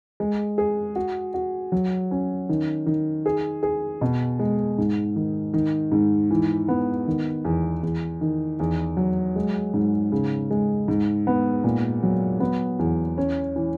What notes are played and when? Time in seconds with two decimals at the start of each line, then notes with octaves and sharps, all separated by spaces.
0.20 G#3
0.58 G#4
0.96 F#4
1.34 F#4
1.72 F#3
2.11 C#4
2.49 D#3
2.86 D#3
3.26 G#4
3.63 G#4
4.01 B2
4.39 G#3
4.78 G#2
5.16 D#3
5.54 D#3
5.92 G#2
6.31 E3
6.68 B3
7.07 D#3
7.45 E2
7.83 E2
8.21 D#3
8.60 E2
8.97 F#3
9.36 G#3
9.74 G#2
10.12 C#3
10.51 G#3
10.88 G#2
11.27 B3
11.64 A#2
12.03 F#3
12.40 B3
12.79 E2
13.18 C#4
13.56 E3